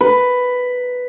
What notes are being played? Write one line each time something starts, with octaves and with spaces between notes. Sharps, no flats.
B4